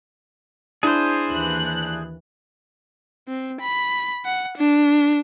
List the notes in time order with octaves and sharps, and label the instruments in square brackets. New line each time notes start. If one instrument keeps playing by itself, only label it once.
[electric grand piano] D4 E4 [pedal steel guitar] G#4 C5
[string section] D#2 E3 F#6
[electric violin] C4
B5
F#5
D4